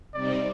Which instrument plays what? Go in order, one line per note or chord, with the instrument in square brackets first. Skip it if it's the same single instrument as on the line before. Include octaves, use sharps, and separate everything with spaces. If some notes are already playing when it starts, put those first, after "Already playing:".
[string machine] C3 G3 C4 D#4 [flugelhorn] D5